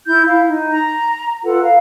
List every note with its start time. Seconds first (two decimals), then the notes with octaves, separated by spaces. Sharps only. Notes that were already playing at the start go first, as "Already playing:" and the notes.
0.07 E4 G6
0.26 E4 F5
0.47 D#4
0.70 A#5
1.44 F4 A4 B4 F#5
1.61 F5 A#5